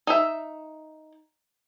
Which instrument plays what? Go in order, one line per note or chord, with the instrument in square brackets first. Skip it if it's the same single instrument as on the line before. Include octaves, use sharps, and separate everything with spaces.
[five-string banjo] D#4 E5